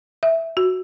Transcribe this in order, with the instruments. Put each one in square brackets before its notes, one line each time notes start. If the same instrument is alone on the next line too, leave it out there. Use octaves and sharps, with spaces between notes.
[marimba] E5
F#4